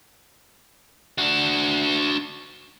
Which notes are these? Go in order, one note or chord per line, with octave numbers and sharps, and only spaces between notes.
D4 F#4